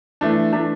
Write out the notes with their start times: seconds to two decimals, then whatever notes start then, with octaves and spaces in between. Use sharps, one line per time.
0.21 E3 A3 D4
0.52 E3 A3 D4